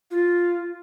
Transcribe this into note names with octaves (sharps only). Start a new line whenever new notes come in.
F4